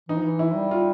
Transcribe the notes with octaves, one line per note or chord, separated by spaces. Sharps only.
E3 D#4
F3
E3
E4
G3
F4